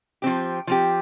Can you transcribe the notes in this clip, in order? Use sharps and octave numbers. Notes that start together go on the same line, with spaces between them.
F3 C4 G4
F3 C4 G4